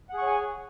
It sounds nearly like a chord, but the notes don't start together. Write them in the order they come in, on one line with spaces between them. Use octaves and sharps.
F#5 G#4 C#6 C#5 G#5